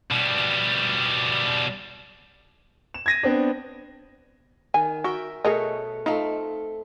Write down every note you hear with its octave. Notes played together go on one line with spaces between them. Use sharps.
B2 G3
E7
G#6 A#6 D#7
B3 C4 D4
D#3 G#5
F#4 A#4 E5 G5
B2 A3 G#4 A#4 C#5 D#5
A3 C4 D#4 F4 F5